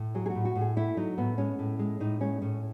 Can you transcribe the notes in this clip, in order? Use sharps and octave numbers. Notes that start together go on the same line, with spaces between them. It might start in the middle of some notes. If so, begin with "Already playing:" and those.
Already playing: A2
F#3 G#4
G#4
F#4
A2
F#4
A2
G#4
A3 E4
F#3 D#4
A2 B3
G#3 C#4
A2
G#3
A2 D#4
G#3 C#4
A2 C#4